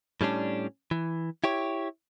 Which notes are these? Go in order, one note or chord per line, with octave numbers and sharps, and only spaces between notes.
A2 G3 C#4 D4
E3
E4 G4 C#5